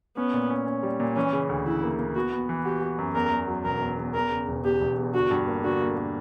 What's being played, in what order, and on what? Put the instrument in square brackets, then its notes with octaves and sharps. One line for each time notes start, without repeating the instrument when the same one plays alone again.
[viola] B3 [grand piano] C#4
[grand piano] A#2
C#4
C#4
G3
A#2
[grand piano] E3 [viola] C#4
[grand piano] C#3
D2
[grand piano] E3 [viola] E4
[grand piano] A#3
A#3
[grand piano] B3 [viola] F#4
[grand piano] B3
E3
[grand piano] F#4 [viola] G4
[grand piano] F#4
F#2
[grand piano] E2 [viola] A#4
[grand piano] E2
F#3
[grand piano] E1 [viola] A#4
[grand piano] E2
E2
[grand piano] E2 [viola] A#4
[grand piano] C#3
E1
[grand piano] E2 [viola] G4
[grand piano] E1
E2
[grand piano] D3 [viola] F#4
[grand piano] G2
A#3
[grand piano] D3 [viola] F#4
[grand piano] A#3
A#3